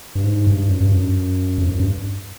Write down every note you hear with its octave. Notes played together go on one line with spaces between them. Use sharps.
G2
G#2
G2
F#2
G2
F#2
F2
F#2
G2